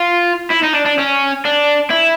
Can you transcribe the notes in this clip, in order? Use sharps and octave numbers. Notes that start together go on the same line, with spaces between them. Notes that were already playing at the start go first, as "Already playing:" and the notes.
Already playing: F4
E4
D#4
D4
D4
C#4
D4
E4